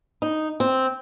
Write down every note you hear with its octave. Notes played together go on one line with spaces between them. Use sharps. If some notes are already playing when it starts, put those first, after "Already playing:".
D#4
C4